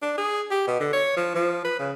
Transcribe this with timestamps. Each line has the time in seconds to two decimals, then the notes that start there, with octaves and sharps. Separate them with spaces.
0.02 D4
0.17 G#4
0.51 G4
0.67 B2
0.80 D3
0.93 C#5
1.17 F3
1.35 F3
1.64 B4
1.79 C#3